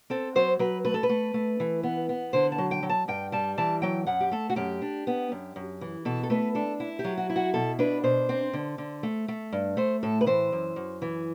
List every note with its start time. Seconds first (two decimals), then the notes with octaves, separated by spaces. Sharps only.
0.10 C4 A4
0.35 F#3 C5
0.59 F#3 B4
0.85 A3 B4
0.94 A4
1.03 B4
1.09 A3
1.34 A3
1.60 E3
1.83 B3
2.09 B3
2.33 D3 C5
2.52 A5
2.58 F#3
2.71 G5
2.83 F#3
2.90 A5
3.08 G2 G5
3.32 G3 A5
3.58 E3 A5
3.82 F#3 G5
4.07 F#2 F#5
4.21 G4
4.31 A3 A4
4.50 F#4
4.56 F#2 G4
4.82 D4
5.07 B3
5.32 F#2
5.56 F#2
5.81 E3
6.05 B2 A4
6.23 A4
6.30 A3 B4
6.55 D4 A4
6.80 E4
6.99 G4
7.04 F#3
7.18 F#4
7.30 E4
7.36 F#4
7.54 B2 A4
7.79 D4 B4
8.04 B2 C5
8.29 C4
8.53 D3
8.78 D3
9.03 A3
9.28 A3
9.53 G2
9.77 A3 C5
10.03 A2 A4
10.21 B4
10.26 E3 C5
10.52 F#2
10.76 F#2
11.02 E3